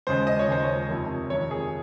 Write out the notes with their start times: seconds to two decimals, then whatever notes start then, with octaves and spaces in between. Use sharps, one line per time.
0.07 D#2 C#3 G#3 C5
0.27 D#5
0.39 C#5
0.48 D#2 C#3 G#3 C5
0.64 C#5
0.89 F2 C3 D#3
1.30 F2 C3 D#3 C#5
1.51 G#4